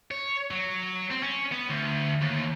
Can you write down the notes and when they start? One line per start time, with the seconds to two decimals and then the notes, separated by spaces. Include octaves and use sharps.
0.11 C#5
0.51 F#3
1.11 C4
1.23 C#4
1.52 B3
1.70 D2
2.22 D#2